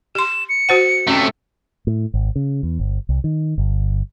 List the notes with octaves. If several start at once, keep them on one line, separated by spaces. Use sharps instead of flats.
G4 C6 E7
C#7
F#4 C5 F#5
C3 A3 C#4
A2
G#1
C#3
E2
G1
C2
D#3
G1